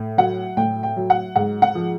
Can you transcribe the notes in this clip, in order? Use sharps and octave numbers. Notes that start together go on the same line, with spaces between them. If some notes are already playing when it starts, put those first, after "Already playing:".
Already playing: A2
F#3 F#5
A2 G5
G5
F#3
F#5
G#2 F#5
F#5
F3